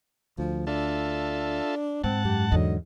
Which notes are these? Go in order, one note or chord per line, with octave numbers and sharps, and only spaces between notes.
D2 F3
D4 F4 A4 E5
G#2 C4 F#5 A5
F#2 G4
E2 G#2 D3 F#3 D#5